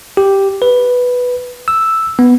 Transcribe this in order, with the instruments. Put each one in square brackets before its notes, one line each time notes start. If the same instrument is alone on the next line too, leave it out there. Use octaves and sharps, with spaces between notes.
[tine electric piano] G4
B4
E6
B3